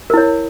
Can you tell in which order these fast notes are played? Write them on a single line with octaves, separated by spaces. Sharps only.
A#4 E4 C#5